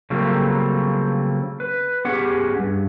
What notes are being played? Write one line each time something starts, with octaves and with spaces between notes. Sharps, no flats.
C#3 F#3 G3 A3 A#3 C4
B4
B3 C#4 G4 G#4 F#5
G2